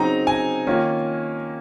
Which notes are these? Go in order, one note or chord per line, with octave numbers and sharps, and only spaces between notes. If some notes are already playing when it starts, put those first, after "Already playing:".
Already playing: C#3 F#3 C4 D#4 A#5
G#5
D#3 A#3 C#4 F4